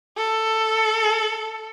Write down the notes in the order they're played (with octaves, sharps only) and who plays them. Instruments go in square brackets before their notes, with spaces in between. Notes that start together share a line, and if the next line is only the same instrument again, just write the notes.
[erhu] A4